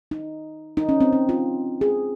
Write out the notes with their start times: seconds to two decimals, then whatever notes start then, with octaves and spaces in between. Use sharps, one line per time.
0.11 D#4
0.77 D#4
0.89 C#4
1.01 C4
1.13 C#4
1.29 F4
1.81 G#4